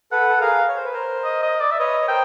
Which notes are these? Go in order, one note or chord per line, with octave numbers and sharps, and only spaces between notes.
A4 B4 F#5
A4
G#4 A#4 F5
C#5
C5
B4
A#4 C5
D#5
D#5
D5
E5
B4 C#5 D#5
C#5
A#4 C5 G5